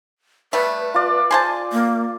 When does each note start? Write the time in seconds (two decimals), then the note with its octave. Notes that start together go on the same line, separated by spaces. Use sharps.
0.53 G3 A3 B4
0.94 F4 D5
1.31 G#4 C5 G#5 A5
1.72 A#3